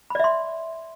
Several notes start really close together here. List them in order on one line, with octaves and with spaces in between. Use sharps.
B5 D5 E5 C6